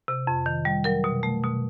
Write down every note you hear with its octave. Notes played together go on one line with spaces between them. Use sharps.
C3
F2
D#3
G3
F#3 A#4
B2
A3
B2